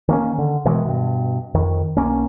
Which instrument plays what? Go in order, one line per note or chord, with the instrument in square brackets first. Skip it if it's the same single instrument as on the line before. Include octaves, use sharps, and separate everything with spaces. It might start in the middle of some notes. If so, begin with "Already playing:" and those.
[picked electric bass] D#3 A#3 C#4
D3
B2 D#3 E3 G#3
G2 B2
F2 D#3
B1 A#3 C#4